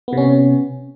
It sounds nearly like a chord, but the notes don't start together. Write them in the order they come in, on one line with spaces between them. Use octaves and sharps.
B3 C3 C#4